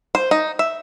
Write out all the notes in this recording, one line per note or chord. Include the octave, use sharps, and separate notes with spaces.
C5
D#4
E5